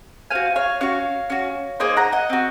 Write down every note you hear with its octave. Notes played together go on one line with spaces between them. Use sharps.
C4 F#4 F5 G#5
C#5 F5
C#4 F#4 C#5 F5
C#4 F#4
A#3 D#4 G#4 C5 D#5
F#5 A#5
D#5 F#5
C4 F#4